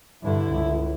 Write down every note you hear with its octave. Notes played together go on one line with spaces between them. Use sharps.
G2 D3 E4
C#2